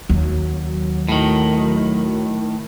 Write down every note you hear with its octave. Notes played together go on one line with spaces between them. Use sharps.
D#2 F#3
A2 D#3